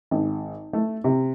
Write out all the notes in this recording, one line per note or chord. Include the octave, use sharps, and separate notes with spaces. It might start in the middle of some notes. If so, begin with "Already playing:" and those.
G#1
A3
C3